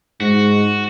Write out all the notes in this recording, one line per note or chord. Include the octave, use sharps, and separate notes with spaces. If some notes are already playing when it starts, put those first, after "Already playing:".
G#2 F#4